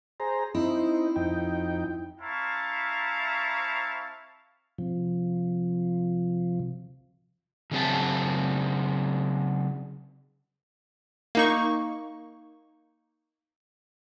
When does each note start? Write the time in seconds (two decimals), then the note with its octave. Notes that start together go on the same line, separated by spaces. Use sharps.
0.20 G#4 C5 A#5
0.55 C4 D#4 E4
1.16 F2 D#4 G5
2.20 C4 E4 F5 A5 A#5 C#6
4.78 C3 F3
7.71 C#3 F#3 C4 G#4 E5 A5
11.35 A#3 D#4 C#6